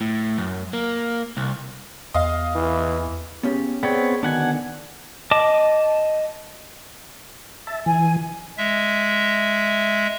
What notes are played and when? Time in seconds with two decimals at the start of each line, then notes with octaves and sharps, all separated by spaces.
0.01 A2
0.38 F#2
0.73 A#3
1.37 C2
2.14 E2 D#5 F5
2.55 E3
3.43 C#3 B3 C#4 G4
3.83 B3 C4 G#4 C#5 D5 G5
4.23 B2 D3 D#3 B3 D4 F#5 G#5
5.31 D#5 A5 D6
7.67 E5 A5
7.86 E3 G#5
8.58 G#3 E5